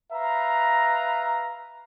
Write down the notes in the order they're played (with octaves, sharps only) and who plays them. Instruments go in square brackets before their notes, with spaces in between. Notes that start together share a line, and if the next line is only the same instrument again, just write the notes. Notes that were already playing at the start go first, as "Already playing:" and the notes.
[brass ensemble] B4 E5 F5 A#5